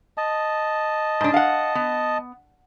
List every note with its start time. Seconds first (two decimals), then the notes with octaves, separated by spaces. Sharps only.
0.18 D#5 A5
1.21 G#2 D4
1.34 F5 F#5
1.75 B3